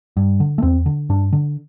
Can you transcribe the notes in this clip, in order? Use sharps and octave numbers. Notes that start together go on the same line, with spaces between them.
G2
D3
A3
E2 C4
D3
G2 D4
D3